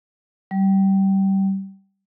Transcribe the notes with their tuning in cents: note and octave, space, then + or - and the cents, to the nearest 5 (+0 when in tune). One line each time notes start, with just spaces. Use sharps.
G3 -20